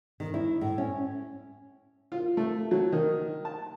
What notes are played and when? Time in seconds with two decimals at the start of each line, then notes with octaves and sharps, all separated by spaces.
0.20 D#3
0.34 E4
0.61 A2
0.78 C#4
2.12 F4
2.37 A3
2.71 F#3
2.92 D#3
3.45 A5